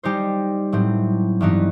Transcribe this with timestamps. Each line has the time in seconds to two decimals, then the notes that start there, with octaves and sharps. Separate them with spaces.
0.03 G3 D#4 G4 C5
0.72 A2 F#3 C4
1.41 G2 E3 B3 D#4